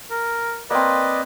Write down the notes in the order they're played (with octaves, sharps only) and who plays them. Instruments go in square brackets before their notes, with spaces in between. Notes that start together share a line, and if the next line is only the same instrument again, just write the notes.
[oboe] A#4
[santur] A#3 C4 [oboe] B4 [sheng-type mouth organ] D5 D#5